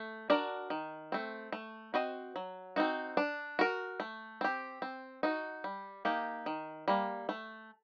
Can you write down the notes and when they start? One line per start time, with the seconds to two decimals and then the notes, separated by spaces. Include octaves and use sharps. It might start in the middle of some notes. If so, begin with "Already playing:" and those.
Already playing: A3
0.30 D4 F#4 A#4 D5
0.70 D#3
1.12 A3 C4
1.52 A3
1.94 C4 F#4 C5 D#5
2.36 F#3
2.76 C4 D#4 F#4
3.17 D4
3.59 F#4 A#4
4.00 A3
4.41 C4 G4
4.82 C4
5.23 D#4 F#4
5.64 G3
6.05 A#3 D#4 G4
6.46 D#3
6.88 G3 A#3
7.29 A3